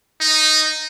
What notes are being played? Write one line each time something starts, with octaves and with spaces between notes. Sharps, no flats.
D#4